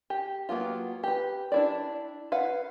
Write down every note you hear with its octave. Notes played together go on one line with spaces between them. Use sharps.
G4
F#3 A#3 B3 F4
G4 B4
D4 E4 D5
B4 F5 F#5